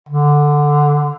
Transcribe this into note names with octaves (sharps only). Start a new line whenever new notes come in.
D3